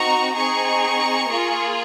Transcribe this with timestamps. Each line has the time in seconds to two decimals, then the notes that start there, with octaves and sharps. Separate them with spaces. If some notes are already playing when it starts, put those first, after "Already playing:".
Already playing: C4 D#4 F#4 A#5 C#6
0.35 C4 D#4 G#4 A#5 C#6
1.29 A#3 F4 G#4